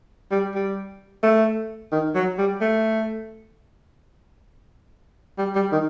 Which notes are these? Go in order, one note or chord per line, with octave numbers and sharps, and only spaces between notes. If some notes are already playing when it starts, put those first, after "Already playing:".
G3
G3
A3
D#3
F#3
G3
A3
G3
G3
D#3